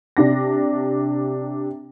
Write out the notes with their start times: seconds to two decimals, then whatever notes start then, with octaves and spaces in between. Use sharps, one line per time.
0.17 C3 D4 A#6